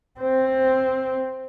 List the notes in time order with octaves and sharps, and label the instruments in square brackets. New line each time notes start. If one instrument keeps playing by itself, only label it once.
[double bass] C4